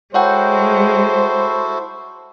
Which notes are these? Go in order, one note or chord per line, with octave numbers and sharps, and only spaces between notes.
G#3 E4 F#4 A4 C5 C#5 F#5 G5